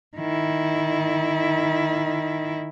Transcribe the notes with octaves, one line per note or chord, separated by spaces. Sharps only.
D#3 E4